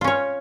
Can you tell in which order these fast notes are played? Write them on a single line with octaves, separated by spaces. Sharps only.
F4 C#4 C#5